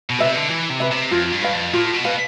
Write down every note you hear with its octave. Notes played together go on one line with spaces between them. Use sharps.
B2
C3 B4 E5
D3
E3 E4
C3
B4 E5
C3
F2 F4
G2
B4 F5
F2
A2 F4
B2
B4 F5